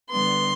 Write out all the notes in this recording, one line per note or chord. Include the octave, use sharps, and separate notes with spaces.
D3 G3 B3 C6